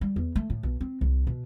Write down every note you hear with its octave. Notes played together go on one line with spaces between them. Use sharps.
G3
E2
A3
A2
B1
C4
C2
B2